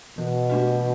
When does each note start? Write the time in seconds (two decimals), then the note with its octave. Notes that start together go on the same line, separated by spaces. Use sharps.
0.18 B2 E3
0.50 A3 D4 F#4